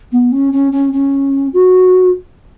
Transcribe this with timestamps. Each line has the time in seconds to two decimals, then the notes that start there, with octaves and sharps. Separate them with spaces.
0.12 B3
0.32 C#4
0.52 C#4
0.72 C#4
0.93 C#4
1.53 F#4